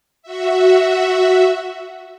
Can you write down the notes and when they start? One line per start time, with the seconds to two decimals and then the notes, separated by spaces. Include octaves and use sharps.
0.22 F#4 E5